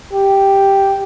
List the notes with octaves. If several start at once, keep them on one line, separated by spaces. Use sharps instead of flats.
G4